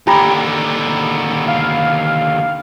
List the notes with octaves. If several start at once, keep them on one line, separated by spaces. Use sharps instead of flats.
D#2 D3 G4 A#5 B5
F5